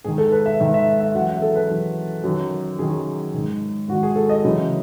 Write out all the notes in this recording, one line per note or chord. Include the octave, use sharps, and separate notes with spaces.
G#2 D#3 G#4
A4
B4
E5
G#2 D#3 E5
E5
E5
F#2 E3 F#5
E5
G#4
A4
B4
F#2 E3
F#2 D#3
F#2 D#3 G#4
G#2 D#3
G#2 D#3 F#4
G#4
A4
D#5
F#2 C#3 E3